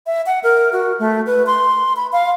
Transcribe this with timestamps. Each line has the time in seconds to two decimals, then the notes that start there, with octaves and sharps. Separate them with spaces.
0.07 E5
0.26 F#5
0.43 A#4
0.73 F#4
0.99 A3
1.26 B4
1.46 C6
1.96 B5
2.12 F5